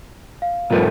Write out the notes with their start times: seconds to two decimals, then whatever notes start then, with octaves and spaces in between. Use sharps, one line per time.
0.42 F5
0.70 B1 G#2 A3 F4 A#4 B4